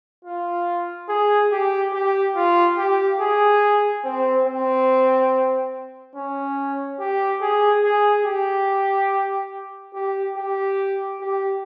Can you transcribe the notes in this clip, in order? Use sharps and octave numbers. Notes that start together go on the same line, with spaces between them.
F4
G#4
G4
G4
F4
G4
G#4
C4
C4
C#4
G4
G#4
G#4
G4
G4
G4
G4